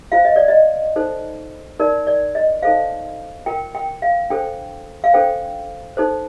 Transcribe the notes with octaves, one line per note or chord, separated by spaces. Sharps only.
F4 C5 F5
D#5
D5
D#5
D#4 A4 C5
D#4 A#4 D5
D5
D#5
D#4 A4 C5 F5
F4 A#4 G5
G5
F5
D4 A4 C5 G5
F5
D4 A4 C5 G5
D#4 A4 C5